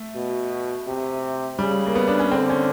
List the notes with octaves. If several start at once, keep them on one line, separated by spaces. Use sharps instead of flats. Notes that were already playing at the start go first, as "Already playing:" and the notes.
Already playing: A3
B2
C3
C#3 G3
A#3
B3
D4
C#4
D3 C4
C#4